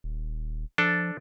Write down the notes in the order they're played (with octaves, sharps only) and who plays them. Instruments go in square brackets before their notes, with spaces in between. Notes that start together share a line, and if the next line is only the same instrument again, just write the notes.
[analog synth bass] D#1
[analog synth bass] F3 [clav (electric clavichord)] D4 A4